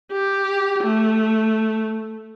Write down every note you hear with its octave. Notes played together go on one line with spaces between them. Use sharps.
G4
A3